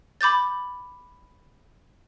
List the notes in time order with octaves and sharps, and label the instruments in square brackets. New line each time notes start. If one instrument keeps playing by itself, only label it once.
[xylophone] B5 D6 G6 A6